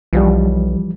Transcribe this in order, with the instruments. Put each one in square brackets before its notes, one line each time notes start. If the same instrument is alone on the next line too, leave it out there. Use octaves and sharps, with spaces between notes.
[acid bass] B1 [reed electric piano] E3 F3 G3